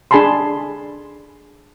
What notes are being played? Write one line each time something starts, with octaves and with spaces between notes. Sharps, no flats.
D4 G#4 G#5 A5 B5 C6